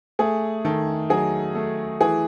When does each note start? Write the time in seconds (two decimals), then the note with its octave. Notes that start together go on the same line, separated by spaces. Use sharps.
0.19 A3 G#4
0.65 D#3 A4
1.10 F#3 G#4
1.55 A3
2.01 E3 G#4